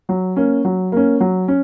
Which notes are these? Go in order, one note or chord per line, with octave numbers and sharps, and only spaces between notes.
F#3
A#3 C#4
F#3
A#3 C#4
F#3
C#4